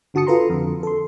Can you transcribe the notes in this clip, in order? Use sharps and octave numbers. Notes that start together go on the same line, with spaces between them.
G1 D3 F#4 A5 D#6 C#7
F4 A4 B4 A#5 C6
F2 D3
A4 C6